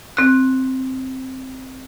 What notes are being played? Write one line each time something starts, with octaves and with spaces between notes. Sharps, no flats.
C4 F#6